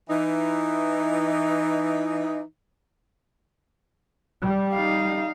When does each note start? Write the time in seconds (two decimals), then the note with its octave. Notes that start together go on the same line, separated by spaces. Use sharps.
0.10 E3 D#4
4.44 G3
4.74 D#4 F5